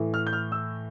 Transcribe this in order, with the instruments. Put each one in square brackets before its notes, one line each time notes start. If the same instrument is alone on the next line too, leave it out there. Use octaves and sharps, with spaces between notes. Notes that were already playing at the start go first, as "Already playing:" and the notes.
Already playing: [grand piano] A2 E3 A3
F6
G6
F6
E6